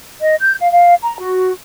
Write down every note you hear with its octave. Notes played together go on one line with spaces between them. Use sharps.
D#5
G6
F5
F5
A#5
F#4